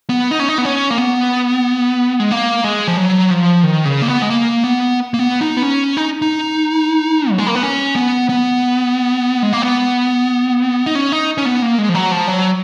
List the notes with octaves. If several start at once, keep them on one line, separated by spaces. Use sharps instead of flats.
B3
D#4
C#4
D#4
B3
C#4
A#3
B3
G#3
A#3
G#3
F3
F#3
F3
D#3
C#3
A#3
B3
G#3
A#3
B3
A#3
B3
D#4
B3
C#4
D#4
D#4
F#3
G#3
A#3
B3
C#4
B3
B3
G#3
A#3
B3
D#4
C#4
D#4
C#4
B3
A#3
G#3
F3
F#3
F3
F#3